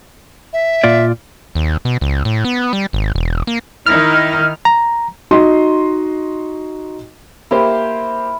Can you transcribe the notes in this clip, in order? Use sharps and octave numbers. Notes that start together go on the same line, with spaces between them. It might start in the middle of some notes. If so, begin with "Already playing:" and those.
E5
A#2 F4 D5
D#2
B2
C#2
A2
B3
G3
G#1
E1
A#3
D#3 D#4 E4 F6
A#5
D#4 F#4 D#5 C6
A#3 E4 G4 C5